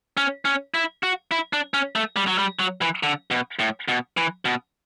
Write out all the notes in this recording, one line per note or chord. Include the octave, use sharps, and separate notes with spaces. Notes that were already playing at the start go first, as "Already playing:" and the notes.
C#4
C#4
E4
F#4
E4
D4
C#4
A3
G3
F#3
G3
F#3
E3
D3
B2
A2
B2
E3
B2